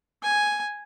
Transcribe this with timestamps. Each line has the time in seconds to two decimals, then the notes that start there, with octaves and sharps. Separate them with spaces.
0.22 G#5